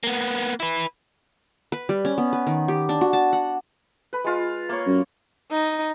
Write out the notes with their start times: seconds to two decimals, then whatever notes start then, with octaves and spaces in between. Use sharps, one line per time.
0.04 A#3 B3
0.60 E4 B4
1.72 B4
1.89 G3
2.05 C#4
2.18 B3
2.33 B4
2.47 D#3
2.68 G4
2.89 D4
3.01 F#4
3.13 A5
3.33 F#5
4.13 B4
4.24 G#3 F4
4.69 A#3 C#5
4.86 F#2
5.51 D#4